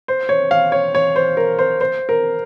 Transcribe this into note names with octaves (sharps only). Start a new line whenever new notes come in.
C5
C#5
F5
C#5
C#5
C5
A#4
C5
C5
A#4